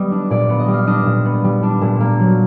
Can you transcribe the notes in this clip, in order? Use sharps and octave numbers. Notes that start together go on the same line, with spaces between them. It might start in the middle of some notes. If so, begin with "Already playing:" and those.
Already playing: G3 B3 D#5
D4
A#2 D5
B3
D#5
G3
F5
D4 D#5
A#2
B3
G3
D4
A#2
A#3
F#3